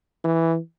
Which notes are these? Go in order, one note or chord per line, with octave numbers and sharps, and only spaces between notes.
E3